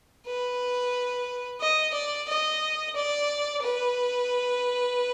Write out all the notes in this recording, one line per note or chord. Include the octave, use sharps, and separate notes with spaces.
B4
D#5
D5
D#5
D5
B4